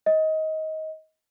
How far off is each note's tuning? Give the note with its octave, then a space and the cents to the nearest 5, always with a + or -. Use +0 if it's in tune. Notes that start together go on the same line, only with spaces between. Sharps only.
D#5 +20